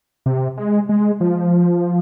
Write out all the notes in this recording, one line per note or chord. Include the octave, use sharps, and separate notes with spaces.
C3
G#3
G#3
F3